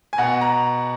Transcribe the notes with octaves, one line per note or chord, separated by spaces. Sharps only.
G#5
B2 F#5
A#5